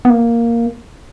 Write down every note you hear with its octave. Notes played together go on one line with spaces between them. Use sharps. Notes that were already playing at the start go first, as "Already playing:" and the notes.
B3
A#3